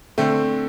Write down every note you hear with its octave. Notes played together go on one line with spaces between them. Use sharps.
D3 A3 C4